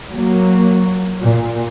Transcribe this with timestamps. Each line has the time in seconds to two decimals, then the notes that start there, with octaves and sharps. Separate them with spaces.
0.11 F#3 A#3
1.23 A#2